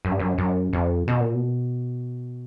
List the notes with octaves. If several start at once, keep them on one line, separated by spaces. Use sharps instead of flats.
F#2
G2
F#2
F#2
F2
B2
A#2
B2